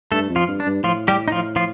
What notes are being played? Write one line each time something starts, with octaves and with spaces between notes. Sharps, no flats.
G2 A3 A4
F2
F3 F4
G2
D4
G2
A2 F3 F4
G3 G4
D#4
F3 F4
F3 F4